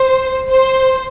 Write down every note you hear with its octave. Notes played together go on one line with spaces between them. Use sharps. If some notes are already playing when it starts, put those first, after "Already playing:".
Already playing: C5
C5